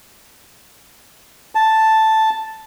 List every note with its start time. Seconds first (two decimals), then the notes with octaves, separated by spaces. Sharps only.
1.55 A5